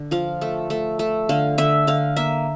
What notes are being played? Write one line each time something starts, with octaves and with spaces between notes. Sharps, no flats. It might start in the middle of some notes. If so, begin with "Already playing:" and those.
Already playing: D3
F3 F5
A3
A3
A3
D3 F5
D3 E5
D3 F5
A#3 E5